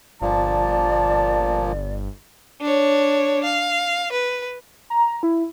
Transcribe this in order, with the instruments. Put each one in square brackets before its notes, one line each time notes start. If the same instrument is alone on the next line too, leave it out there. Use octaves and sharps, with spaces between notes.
[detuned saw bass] G1 [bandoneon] A#2 F3 A#3 [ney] D5 [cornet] A5
[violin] D4 C#5
F5
B4
[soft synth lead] A#5
E4